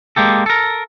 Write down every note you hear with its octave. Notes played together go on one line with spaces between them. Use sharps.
G#3 A#3 G4 A4
A4 A#4